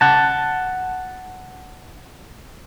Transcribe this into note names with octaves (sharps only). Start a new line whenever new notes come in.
F#5 A5